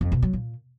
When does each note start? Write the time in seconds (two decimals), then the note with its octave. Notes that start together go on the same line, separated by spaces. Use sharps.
0.01 F2
0.12 B2
0.22 F#3
0.33 A#2